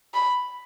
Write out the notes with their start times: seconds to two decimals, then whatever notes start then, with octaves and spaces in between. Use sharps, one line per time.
0.14 B5